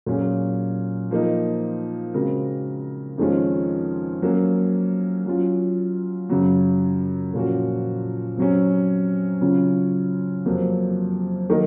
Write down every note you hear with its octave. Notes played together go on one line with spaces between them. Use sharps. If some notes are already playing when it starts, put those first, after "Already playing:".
A#2 F#3 C#4 G#4
F3 A#3 D#4
C#3 G#3 C4 F#4 A#4
F2 D#3 G#3 C#4 F4
F#3 A#3 C#4
F#3 C#4 F4
F#2 C#3 F#3
A#2 F3 A#3 C#4 F#4
C3 F#3 C#4
C#3 F#3 C#4 F4
F2 C3 F#3 A#3
D#3 F#3 A#3 D#4 A#4